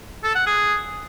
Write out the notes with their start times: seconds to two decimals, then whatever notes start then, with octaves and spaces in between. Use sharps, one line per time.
0.24 A4
0.35 F#5
0.46 G#4